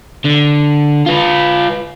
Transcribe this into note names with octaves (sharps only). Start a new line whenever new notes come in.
D3
F4 B4